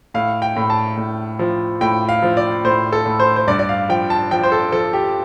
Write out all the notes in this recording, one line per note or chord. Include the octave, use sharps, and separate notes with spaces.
A2 F5
G5
A2
A5
A2
F3
A2 G5
F5
F3
D5
A2 C5
A4
A2
C5
C5
G2 D5
D5
F5
F3 G5
A5
F3 G5
C5
A4
F3 A4
G4